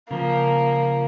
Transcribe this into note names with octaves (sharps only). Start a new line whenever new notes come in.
C#3 F3 A#3